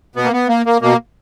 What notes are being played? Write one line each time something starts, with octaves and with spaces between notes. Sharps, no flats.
B2 B3
A#3
B3
A#3
A#3
B2 A#3